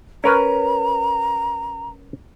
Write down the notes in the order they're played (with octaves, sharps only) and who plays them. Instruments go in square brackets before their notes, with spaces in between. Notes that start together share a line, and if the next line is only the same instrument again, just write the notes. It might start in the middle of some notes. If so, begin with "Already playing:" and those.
[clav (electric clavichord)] C#4 A#4 B4 [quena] A#5